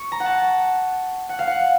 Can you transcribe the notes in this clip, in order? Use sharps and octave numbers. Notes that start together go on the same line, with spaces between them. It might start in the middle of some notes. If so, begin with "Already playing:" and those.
Already playing: C#6
A#5
F#5
A5
F#5
F5
F#5